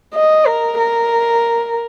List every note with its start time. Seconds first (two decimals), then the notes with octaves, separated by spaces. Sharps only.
0.15 D#5
0.47 A#4
0.79 A#4